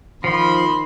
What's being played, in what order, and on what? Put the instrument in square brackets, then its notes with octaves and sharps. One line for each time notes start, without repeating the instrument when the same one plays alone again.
[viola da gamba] D#3 [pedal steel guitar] F3 [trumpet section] B5 C6